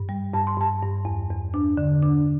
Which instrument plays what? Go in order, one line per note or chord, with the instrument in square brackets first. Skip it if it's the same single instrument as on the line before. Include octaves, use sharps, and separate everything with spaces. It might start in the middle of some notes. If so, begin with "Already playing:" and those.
Already playing: [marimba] G2
G3
G2 A5
C6
G2 A5
G2
E2
E2
D4
D3
D4